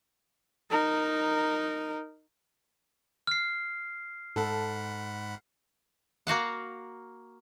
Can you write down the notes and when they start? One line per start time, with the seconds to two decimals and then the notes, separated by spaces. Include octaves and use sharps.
0.70 D#4 A#4
3.27 F6 C7
4.36 G#2 A4 F#5 B5
6.27 A#3 F#4 F5 F#5